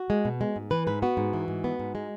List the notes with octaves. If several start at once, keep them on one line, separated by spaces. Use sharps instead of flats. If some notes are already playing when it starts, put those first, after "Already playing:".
Already playing: F#4
G#3
B2
G#3
G#2
E3 B4
G#2 B4
B3 F#4
G#2
E3
G#2
B3
G#2
G#3